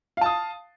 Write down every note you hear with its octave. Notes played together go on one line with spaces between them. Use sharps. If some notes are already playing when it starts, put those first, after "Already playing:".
F5 A5 D#6